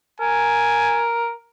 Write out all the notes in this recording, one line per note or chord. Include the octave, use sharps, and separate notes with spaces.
A#4 G#5